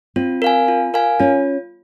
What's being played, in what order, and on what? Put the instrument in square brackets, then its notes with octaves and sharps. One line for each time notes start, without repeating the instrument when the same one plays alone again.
[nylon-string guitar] C4 [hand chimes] F4
[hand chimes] A#4 F5 G#5
F4
A#4 F5 G#5
[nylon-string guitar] C#4 [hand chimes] F4